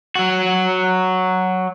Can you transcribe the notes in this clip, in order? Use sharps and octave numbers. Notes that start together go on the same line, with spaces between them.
F#3 F#4